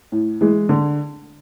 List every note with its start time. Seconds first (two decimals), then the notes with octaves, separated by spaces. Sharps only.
0.12 A2
0.41 E3 G#3
0.69 D3